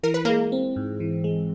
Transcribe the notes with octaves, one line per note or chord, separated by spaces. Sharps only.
E3 A#4
B4
G#3 A#3 A#4
C4
G#2
E3
G#3